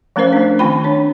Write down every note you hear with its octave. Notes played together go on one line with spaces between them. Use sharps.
F3 A3 C#4 A#4 C5 F5
A3 D4
D#3 A3 C4 F4 G5 B5
D4 C#5